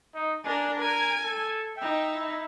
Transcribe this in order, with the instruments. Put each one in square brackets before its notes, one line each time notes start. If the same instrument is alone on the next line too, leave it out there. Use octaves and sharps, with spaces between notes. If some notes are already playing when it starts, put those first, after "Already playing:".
[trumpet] D#4
[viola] D4 A#4 [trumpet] G#5
[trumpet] A#4 [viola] G#5
[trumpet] A4
[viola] D#4 E5 [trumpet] G5
[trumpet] E4